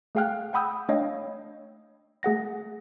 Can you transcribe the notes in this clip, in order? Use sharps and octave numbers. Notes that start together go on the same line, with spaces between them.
A3 G#4 F5 G5 F6 F#6
F#5 G5 B5 D#6 E6 G6
A3 D4 C#5 D#5 F5 G5
A3 G#4 F#5 A#6